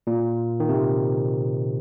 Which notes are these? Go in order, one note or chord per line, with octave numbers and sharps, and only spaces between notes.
A#2
D#3
C3